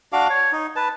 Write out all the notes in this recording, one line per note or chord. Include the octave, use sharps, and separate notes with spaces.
D4 F#4 F5 D6
C#5
D#4
B4 A5